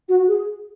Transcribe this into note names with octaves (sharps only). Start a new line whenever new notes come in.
F#4
G#4